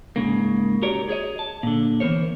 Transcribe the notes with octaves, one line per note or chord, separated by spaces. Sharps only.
G#2 C#3 A#3
F#4 G4 A#4 C#5 D5
G#4 C#5 D#5
A5
A#2 D3
E3 B3 F4 A#4 C5 C#5